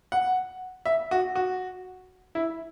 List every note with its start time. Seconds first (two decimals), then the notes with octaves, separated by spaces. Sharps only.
0.12 F#5
0.86 E5
1.11 F#4
1.36 F#4
2.35 E4